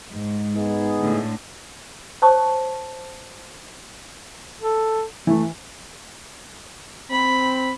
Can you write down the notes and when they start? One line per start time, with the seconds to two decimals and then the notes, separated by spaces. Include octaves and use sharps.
0.12 G#2
0.55 B3 D#4 G#4
0.98 A2 D3
2.22 C5 C#5 A5 C#6 D#6
4.62 A4
5.27 E3 A3
7.10 C4 B5